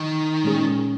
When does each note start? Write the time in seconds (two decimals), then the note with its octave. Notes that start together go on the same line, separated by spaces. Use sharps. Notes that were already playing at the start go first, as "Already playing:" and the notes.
Already playing: D#3
0.44 A#2 G#3 C#4 G#4